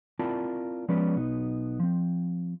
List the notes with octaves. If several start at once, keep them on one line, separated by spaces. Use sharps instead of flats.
C4 E4 F4 A#4 D5 A5
F3 G#3 B3 C#4 B4 D5
B1 B3 D#4
F3 C4